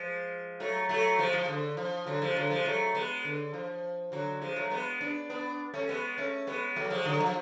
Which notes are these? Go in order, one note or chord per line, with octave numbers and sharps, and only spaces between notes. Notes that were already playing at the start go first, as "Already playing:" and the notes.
Already playing: F3 G#3
F#3 A3
F#3 A3
F3 G#3
F3
D3
F3
D3 F#3
F3 G#3
D3 F#3
F3 G#3
F#3 A3
G#3 B3
D3
F3
D3 F#3
F3 G#3
F#3 A3
G#3 B3
B3 D4
B3 D4
A3 C#4
G#3 B3
A3 C#4
G#3 B3
F#3 A3
F3 G#3
D3 F#3
F3